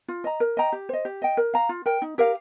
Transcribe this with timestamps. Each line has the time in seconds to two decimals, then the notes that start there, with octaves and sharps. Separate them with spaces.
0.08 F4
0.24 D#5 A#5
0.40 A#4
0.57 D#5 G5 A#5
0.72 G4
0.89 C5 D#5
1.05 G4
1.22 D#5 G5
1.37 A#4
1.54 F5 A#5
1.69 F4
1.86 A#4 G5
2.02 D#4
2.18 G4 A#4 F5